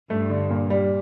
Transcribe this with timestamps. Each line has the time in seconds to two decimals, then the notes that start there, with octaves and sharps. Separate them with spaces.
0.10 G2 A3
0.30 D3
0.50 A#2
0.70 G3